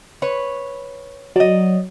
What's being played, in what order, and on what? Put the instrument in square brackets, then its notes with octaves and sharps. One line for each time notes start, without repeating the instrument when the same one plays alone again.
[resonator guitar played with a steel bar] B4 C#5
[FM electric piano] F#3 [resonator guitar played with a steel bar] D5 D#5